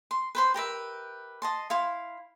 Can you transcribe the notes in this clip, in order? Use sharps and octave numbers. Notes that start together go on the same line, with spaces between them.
C6
B4 C5 C6
G4 A#4 B4 E5
D#5 A5 C6
E4 F5 C6